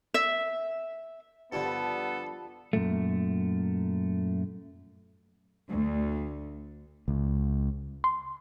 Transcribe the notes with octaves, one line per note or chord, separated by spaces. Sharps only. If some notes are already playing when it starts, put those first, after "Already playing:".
E5
G2 D3 F3 G3 B3 A4 A5
F#2 A#2 A3
D2
C#2
C6